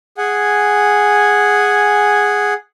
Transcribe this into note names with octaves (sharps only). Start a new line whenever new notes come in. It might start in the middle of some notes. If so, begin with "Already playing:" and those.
G#4 F#5 G#5